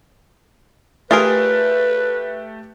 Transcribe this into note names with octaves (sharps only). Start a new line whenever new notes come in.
A3 F4 G4 G#4 A#4 B4